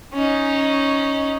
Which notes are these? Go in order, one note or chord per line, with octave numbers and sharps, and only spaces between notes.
C#4 D#4